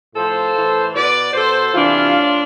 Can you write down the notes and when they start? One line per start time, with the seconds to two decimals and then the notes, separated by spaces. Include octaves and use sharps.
0.14 A2 F3 A4 C5
0.54 A2 E3
0.94 B2 B4 D5
1.34 B2 A4 C5
1.73 C3 E3 D4 F4
2.15 A2